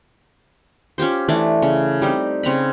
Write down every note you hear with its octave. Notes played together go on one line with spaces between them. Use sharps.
C#4 F4 G4 C5
E3 A3 D4 D5
C#3
G3 C4 D#4
C#3 C4 A#5 B5